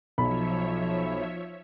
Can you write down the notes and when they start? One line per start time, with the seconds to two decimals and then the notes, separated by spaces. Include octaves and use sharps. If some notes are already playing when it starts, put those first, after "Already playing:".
0.18 B1 F3 C#5 E5 B5